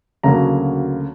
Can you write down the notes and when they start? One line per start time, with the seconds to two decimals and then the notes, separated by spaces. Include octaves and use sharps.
0.23 D2 C#3 F#3 A#3 A#5